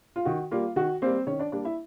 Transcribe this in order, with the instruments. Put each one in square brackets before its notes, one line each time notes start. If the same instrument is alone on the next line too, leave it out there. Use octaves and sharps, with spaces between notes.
[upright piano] F4
D#3 F#4
G3 A#3 F4
D#3 F#4
G3 A#3 C4 C5
D#3 C#4 C#5
D4 D5
G3 A#3 D4 D5
E4 E5